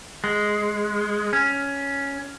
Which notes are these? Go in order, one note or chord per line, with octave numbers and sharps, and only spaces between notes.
G#3
C#4